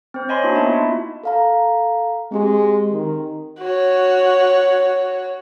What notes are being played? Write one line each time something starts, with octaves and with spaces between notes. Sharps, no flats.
C4 C5
C#5 D#5 G#5 B5 C6
A#3 D4 E4 F#4
B3 D#4 E4 D#5 E5 A5
E4 F4
A4 F5 A#5
G#3 C4 G4 C6
D#3
F#4 C#5